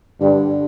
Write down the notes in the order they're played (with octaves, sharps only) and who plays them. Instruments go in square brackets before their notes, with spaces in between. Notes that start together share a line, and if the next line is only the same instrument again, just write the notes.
[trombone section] G2 [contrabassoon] D3